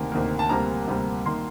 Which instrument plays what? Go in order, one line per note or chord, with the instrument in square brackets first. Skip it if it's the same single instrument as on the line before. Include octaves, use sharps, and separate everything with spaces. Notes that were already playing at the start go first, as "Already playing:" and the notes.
Already playing: [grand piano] D2 C3 D#3 A#3
D2 C3 D#3 A#3
A5
D2 C3 G3 A#3 A#5
D2 C3 G3 A#3
D#3 A#3 C6